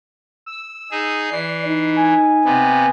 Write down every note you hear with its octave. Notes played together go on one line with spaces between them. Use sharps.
E6
D#4 G#4
E3 D5 C7
D#4
G#5
C3 B3